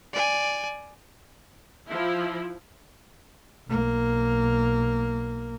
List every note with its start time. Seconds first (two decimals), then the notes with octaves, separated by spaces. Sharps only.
0.13 D5 G#5
1.88 F3 E4
3.68 B1 A#3